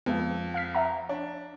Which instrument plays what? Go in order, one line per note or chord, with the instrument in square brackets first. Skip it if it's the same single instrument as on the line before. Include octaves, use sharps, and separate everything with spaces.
[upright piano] F2 F4 [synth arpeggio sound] G#3 B3
[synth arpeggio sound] F5 F6 B6
E5 F#5 A#5
[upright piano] D4 [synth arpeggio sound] C#5